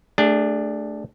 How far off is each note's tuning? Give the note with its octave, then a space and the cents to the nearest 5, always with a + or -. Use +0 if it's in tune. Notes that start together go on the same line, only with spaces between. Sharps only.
A3 +0 D4 +0 G#4 -40